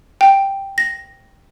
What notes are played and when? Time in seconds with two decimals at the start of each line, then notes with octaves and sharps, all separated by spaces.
0.21 G5
0.78 A#6